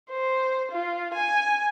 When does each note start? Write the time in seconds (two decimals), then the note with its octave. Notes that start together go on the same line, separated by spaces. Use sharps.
0.11 C5
0.72 F4
1.15 G#5